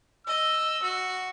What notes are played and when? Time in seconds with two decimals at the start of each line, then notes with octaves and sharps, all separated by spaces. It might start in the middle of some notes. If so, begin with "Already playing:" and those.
0.27 D#5 E6
0.83 F#4